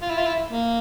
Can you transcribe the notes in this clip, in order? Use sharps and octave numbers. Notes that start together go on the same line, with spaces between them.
F4
E4
F4
E4
A#3